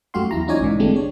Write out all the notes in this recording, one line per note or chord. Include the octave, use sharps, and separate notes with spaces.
F#2 A3 F#4 G4 F5 C6
E2 E4 A#5
C#4 D#4 F4 C#5 D5 G#5
B1 G#2 E3
D3 G#3 A3 C4 D4 G4
C#5